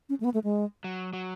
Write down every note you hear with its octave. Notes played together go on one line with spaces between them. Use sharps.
C#4
A3
B3
A3
G#3
F#3
F#3